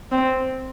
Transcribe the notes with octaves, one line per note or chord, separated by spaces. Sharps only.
C4